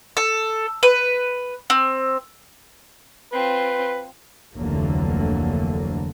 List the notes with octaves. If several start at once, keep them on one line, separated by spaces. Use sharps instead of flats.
A4
B4
C4
C4 F4 B4
F1 D2 D3 E3 F#3 A#3